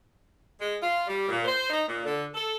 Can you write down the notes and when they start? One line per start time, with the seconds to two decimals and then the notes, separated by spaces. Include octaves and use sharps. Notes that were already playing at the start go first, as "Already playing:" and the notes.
0.60 G#3
0.83 F4
1.07 G3
1.28 A#2
1.45 C5
1.70 D#4
1.87 A#2
2.05 D3
2.34 A4